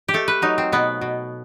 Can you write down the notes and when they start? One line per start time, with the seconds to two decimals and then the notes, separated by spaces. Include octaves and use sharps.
0.08 G4
0.14 A3 A4
0.28 B4
0.42 F#3 D#4
0.58 C4
0.72 B2 B3
1.01 B2